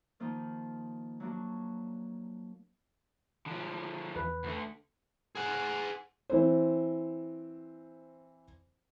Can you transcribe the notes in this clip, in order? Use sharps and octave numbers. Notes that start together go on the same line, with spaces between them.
D#3 F3 A#3 D#4
F#3 A#3 D4 F#4
D3 F3
E2 B4
D2 D3
G#4 F#5
E3 C4 C5